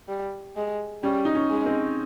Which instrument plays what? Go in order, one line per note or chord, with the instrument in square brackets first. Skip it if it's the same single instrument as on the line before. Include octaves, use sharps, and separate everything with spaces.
[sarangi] G3
G#3
[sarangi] G3 [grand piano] C#4
[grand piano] D#4
C#4
[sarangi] G#3
[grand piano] C4